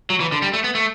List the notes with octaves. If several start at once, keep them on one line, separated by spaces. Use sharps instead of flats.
F#3
E3
D3
G3
A3
B3
A3